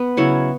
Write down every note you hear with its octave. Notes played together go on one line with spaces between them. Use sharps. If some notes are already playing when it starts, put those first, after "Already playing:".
Already playing: B3
C#3 F#3 E4 C#5